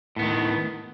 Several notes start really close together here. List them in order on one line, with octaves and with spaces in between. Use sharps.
A2 B3 D#3